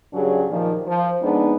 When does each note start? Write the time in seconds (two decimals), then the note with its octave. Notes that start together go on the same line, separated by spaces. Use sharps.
0.13 G2 C#3 F#3 D4 G4 G#4
0.50 A#2 D#3 F3
0.87 F3
1.22 F2 G#3 B3 C4 D4 D#4